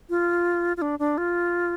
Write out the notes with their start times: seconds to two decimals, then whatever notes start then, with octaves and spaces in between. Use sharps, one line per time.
0.10 F4
0.77 F4
0.82 D4
0.99 D4
1.18 F4